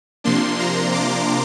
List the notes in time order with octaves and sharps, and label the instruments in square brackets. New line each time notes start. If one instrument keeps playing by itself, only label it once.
[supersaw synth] C3 F3 A#3 D4 C6
A#5
D6